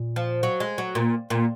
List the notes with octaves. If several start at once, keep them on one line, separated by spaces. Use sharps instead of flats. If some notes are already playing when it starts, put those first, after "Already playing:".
Already playing: A#2
F3
F#3
G#3
F#3
A#2
A#2